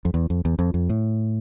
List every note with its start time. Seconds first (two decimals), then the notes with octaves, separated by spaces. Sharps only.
0.05 F2
0.14 E2
0.30 F2
0.45 E2
0.59 F2
0.74 F2
0.89 A2